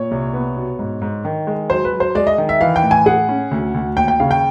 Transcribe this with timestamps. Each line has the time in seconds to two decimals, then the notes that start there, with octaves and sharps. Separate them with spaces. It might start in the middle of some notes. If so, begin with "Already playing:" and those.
Already playing: A#2 C#5
0.11 C2
0.34 B3
0.57 B2
0.79 G#2
1.02 G#2
1.25 D#3
1.47 G#3
1.70 F#3 C5
1.85 B4
1.93 F#3
2.00 C5
2.15 G#3 D5
2.27 D#5
2.38 D#3
2.49 E5
2.61 E3 F5
2.76 G5
2.83 A2
2.91 G#5
3.06 G#4 F#5
3.29 C#4
3.51 D2
3.74 D2
3.97 D#2 G5
4.08 G5
4.20 C#3 F5
4.31 G5